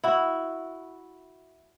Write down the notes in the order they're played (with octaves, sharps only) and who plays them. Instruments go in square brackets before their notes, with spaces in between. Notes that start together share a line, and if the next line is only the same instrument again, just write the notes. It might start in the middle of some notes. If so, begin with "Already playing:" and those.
[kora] E4 F#4